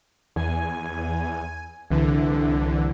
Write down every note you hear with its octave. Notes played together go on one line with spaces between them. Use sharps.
E2 G#5
C2 D3 E3